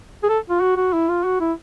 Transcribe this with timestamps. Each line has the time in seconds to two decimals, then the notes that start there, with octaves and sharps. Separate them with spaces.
0.24 G#4
0.29 A4
0.50 F4
0.61 F#4
0.77 F#4
0.93 E4
1.09 F4
1.24 F#4
1.41 E4